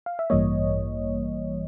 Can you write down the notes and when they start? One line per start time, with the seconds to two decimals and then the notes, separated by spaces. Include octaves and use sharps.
0.06 F5
0.19 E5
0.30 A1 G2 E3 G3 A#3 C#5 D#5